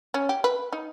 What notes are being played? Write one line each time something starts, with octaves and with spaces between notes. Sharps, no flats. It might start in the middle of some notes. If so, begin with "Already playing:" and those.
C#4
G4
B4
D#4